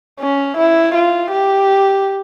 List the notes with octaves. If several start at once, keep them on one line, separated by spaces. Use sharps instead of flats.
C#4
E4
F4
G4